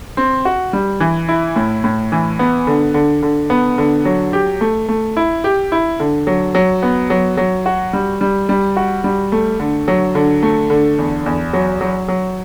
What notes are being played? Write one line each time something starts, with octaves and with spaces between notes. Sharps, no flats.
C4
F#4
G3
E3
E4
A2
A2
E3
B3
D3
D3
D3
B3
D3
F#3
G4
A3
A3
E4
G4
E4
D3
F#3
F#3
B3
F#3
F#3
F#4
G3
G3
G3
F#4
G3
A3
D3
F#3
D3
A3
D3
E2
E2
F#3
F#3
F#3